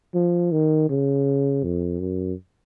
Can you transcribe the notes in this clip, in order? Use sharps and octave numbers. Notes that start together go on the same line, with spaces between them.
F3
D#3
C#3
F2
F#2